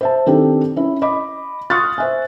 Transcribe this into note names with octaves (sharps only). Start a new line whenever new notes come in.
C5 E5 A5
D#3 C4 D4 G4 A4
C#4 E4
D#5 B5 D6
C6 C#6 D#6 F6 F#6 A6
C5 E5 G#5